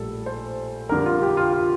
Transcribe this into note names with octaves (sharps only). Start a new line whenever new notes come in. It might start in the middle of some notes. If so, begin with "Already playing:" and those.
Already playing: A#1 A2 G3 A4
C5
F2 D3 G3 A#4
F4
G4
F4
F4